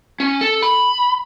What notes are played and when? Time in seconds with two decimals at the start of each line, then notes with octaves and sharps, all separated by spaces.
0.20 C#4
0.41 A4
0.62 B5